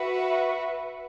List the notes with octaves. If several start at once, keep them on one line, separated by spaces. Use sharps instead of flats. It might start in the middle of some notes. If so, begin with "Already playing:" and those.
Already playing: F#4 B4 E5